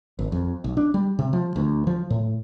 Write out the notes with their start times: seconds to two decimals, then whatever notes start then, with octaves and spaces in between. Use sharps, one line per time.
0.19 G#1
0.32 F2
0.64 B1
0.77 D4
0.94 G3
1.19 C3
1.33 F3
1.56 D2
1.87 F3
2.10 A2